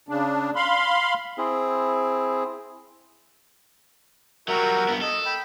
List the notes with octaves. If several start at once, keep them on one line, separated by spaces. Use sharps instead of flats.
C#3 D4
F5 B5 C6
C4 E4 G#4
F#3 G3 F#4 A#4 E5
G2 B3
A4 D#5
G5 B5